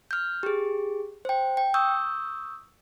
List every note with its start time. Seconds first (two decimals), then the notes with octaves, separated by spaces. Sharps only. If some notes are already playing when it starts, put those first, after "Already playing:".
0.11 F6 G6
0.43 G4 G#4
1.25 C5 G5
1.57 G5
1.74 C#6 D#6 E6 G6